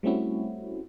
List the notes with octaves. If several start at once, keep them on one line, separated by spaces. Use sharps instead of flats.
G3 A3 C4 C#4 E4 F#4